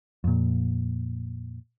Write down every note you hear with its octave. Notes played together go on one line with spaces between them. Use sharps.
F2 A#2